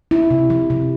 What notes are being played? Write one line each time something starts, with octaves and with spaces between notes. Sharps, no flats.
E4
C3
F3
C3